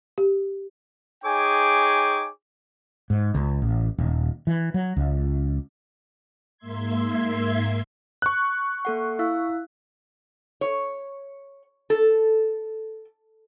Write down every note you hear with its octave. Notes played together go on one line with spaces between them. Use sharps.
G4
D#4 G#4 C#5 G5 G#5 D6
G#2
C#2
A1
D#1
E3
F#3
C#2
G#2 A#3 E5 C6 G#6
C#6 F#6
A#3 A4 F#5
E4 F5 E6
C#5
A4